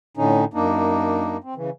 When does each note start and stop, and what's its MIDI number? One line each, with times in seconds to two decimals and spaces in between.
0.17 0.44 45
0.17 0.44 50
0.17 0.44 61
0.17 0.44 63
0.54 1.37 42
0.54 1.37 58
0.54 1.37 62
0.54 1.37 63
1.44 1.54 60
1.56 1.70 49
1.56 1.70 52